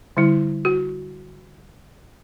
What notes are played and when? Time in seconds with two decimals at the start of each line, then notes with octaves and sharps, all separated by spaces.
0.17 D3 G3 E4
0.65 F#4